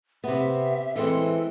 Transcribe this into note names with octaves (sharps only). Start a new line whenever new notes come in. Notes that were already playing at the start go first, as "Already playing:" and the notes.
C3 B3 E5
E3 G#3 C4 A4